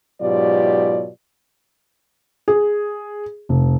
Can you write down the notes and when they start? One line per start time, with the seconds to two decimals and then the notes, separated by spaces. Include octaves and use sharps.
0.22 G#2 B2 F#3 F4 G4 D5
2.48 G#4
3.49 F1